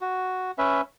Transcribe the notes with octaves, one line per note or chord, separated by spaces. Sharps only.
F#4
C#4 B4 E5